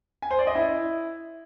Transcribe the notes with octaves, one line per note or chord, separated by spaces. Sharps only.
G#5
C5
D5
D#5
E4